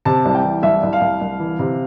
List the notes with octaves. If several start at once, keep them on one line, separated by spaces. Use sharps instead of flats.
C3 A5
C2
G5
E3
C2 E5
C2
F5
C2
C2
E3
C3